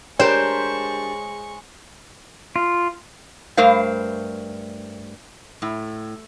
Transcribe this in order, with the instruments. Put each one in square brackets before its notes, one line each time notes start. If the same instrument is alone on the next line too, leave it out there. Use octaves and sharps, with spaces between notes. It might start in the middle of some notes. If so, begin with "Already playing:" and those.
[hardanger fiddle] G#3 C#6 [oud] D4 G4 A#4 [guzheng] C5 [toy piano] C#5
[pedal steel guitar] F4
[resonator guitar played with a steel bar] G2 A3 A#4 C5 F5
A2